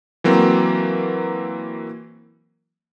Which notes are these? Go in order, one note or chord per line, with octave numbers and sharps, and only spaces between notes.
E3 F#3 A#3 C4